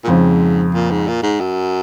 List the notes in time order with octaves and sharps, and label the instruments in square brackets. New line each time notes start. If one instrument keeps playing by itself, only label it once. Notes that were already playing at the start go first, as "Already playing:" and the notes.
[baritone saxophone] A#2
[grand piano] F2 C#3 F3 C4 F4 [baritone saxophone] G#2
[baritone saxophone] A#2
G#2
A#2
G#2
F#2